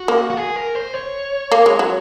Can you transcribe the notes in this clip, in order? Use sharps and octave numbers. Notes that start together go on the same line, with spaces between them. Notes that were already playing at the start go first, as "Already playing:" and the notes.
Already playing: F#4
A#3
F#4
G#4
A#4
C5
C#5
A#3
G#3
F#3